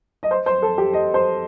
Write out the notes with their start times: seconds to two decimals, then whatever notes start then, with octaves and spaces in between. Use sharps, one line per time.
0.23 D#5
0.31 C5
0.46 C5
0.62 A4
0.78 G4
0.93 D#5
1.14 C5